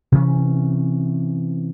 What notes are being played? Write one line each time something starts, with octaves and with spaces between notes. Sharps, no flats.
C3 E3 C#4